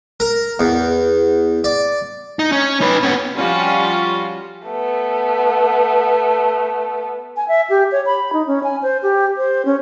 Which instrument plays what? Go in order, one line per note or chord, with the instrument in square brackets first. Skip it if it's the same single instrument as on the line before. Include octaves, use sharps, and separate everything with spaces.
[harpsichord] A#4
E2
D5
[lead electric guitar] D#4
C#4
D#4 B4
B3 C#4
[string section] F3 G3 C#4 F4 F#4
[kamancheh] A3 B3
[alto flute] G#5
E5
G4
C#5
B5
D#4
C#4
G#5
C5
G4
C5
C#4